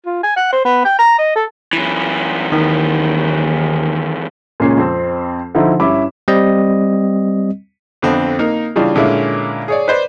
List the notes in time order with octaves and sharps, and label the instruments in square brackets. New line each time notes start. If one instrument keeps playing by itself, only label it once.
[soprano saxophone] F4
G#5
F#5
C5
B3
G5
A#5
D#5
A4
[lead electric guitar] F#2 E3
[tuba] D#2 [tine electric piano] D#3
[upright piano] A#2 C#3 G#3 A#3 C#4 C7
F2 C4
D3 F3 D#4 E4
G2 C#4 E4 E5 B5 D6
[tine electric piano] G3 C4 D#5
[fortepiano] F2 D3 B3 C4
A#3 D#4 A#4
C#3 E3 G3 D4 F4
A#2 D3 G#3 A#3 C#4 E4
G#4 C#5 D5
B4 C5 D5